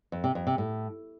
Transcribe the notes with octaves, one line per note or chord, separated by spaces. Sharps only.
F2
C3
F2
C3
A2